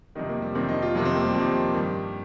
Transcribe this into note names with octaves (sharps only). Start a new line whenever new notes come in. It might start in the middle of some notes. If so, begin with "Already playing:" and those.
F2 C3 D#3 D#4
A#3
G3
F2 C3 D#3 C4
D#4
F4
F2 C3 D#3 D#4
C4
A#3
G3
F2 C3 D#3
G2 D#3